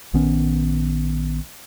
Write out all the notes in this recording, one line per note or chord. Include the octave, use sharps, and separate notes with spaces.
A#1 D#3 B3 C#4